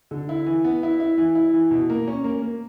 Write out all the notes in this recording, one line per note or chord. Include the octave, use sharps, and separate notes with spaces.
D3
E4
E3
B3
E4
E4
E3
E4
E3
B2
A#3
C#4
A#3
A#3